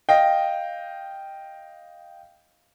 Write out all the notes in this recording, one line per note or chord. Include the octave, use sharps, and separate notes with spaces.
D#5 F5 G5